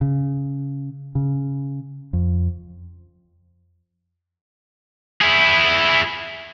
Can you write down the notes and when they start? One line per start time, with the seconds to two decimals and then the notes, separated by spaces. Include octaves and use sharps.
0.01 C#3
1.15 C#3
2.13 F2
5.22 E4 G#4